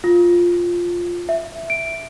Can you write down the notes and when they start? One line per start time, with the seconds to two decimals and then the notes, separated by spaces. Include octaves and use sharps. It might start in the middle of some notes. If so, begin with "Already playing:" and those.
0.04 F4
1.29 E5
1.70 D7